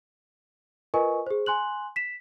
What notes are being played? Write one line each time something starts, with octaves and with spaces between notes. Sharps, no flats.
F4 A#4 B4 D#5 G#5 C#6
G#4 C5
G#5 C6 F#6 F#7
B6 E7